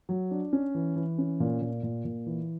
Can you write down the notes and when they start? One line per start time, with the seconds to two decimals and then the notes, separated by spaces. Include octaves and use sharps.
0.09 F#3
0.31 D4
0.53 C#4
0.75 E3
0.96 E3
1.18 C#4
1.40 A#2
1.62 A#2
1.83 A#2
2.05 A#2
2.26 E3